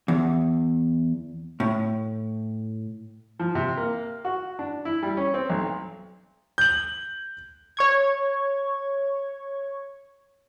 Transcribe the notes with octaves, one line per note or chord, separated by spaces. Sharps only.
E2
A2
F3
C3
A#3
F#4
D4
E4
G3
C#4
C4
B1
G6 F#7
C#5 C#6 G#6